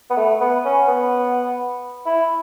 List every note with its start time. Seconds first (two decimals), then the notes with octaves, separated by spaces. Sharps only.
0.10 B3
0.17 A3
0.41 B3
0.65 C#4
0.88 B3
2.06 E4